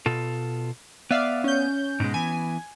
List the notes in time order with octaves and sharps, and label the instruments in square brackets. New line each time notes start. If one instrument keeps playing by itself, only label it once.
[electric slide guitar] B2 F4 A4
[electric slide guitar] B3 [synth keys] D5 E5 F5
[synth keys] C#4 G6
[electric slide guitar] G#2 B2 G#3
[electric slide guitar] E3 B3 [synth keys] G#5